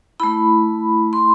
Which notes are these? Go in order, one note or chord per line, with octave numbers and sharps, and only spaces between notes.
A3 E4 B5
C6